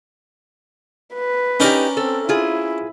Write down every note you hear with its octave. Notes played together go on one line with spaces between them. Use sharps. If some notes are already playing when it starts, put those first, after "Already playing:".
B4
C#4 D#4 G4 A#4 D5
C4 A4
E4 F4 G#4